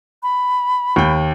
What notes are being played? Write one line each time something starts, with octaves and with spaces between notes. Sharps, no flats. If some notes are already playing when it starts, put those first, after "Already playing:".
B5
D#2 G5